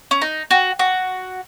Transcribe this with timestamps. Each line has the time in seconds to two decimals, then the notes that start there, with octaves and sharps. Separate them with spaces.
0.11 C#4
0.22 D#4
0.51 F#4
0.79 F#4